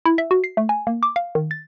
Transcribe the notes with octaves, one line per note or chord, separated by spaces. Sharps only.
E4
E5
F#4
C7
A3
G#5
A#3
D6
F5
D#3
A6